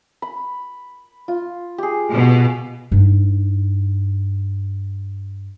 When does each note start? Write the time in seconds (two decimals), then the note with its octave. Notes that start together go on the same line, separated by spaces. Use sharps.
0.22 B5
1.28 F4
1.78 G4 G#4
2.11 B2
2.92 G2 D#4